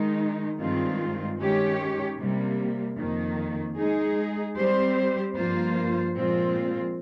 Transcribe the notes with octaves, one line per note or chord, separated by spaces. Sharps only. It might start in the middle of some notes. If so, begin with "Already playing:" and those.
Already playing: D#3 G#3 D#4
G2 D#3 G#3 C4 F4
D#3 G#3 C#4 G4 C#5
C3 G3 A#3
F2 D#3 A#3
G#3 D#4 G#4
G3 C4 G4 C5
G2 F3 A#3 F4 C5
A#2 F3 G#3 C4 F4